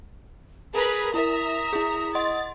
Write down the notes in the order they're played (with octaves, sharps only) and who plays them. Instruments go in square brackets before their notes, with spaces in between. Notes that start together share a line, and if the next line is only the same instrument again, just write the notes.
[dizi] G#4 [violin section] A#4 B4 B5
[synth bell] E4 A#4 [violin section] E5 A#5 [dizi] D#6
[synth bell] E4 G#4
[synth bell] D#5 F#5 C6 [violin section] A6